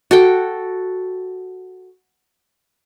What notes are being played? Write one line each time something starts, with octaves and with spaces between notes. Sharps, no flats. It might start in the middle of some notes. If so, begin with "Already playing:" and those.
F#4 A4 G5